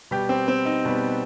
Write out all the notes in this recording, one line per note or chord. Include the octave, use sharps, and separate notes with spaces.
B2 G3 B3 G4
C4
C4
D#4
B2 G3 B3